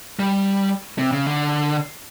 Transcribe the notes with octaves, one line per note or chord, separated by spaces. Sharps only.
G3
C3
C#3
D3